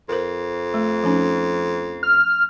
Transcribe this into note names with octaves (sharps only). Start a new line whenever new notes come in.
F2 A#4 C5
A3
F3 C#4 D#4
F6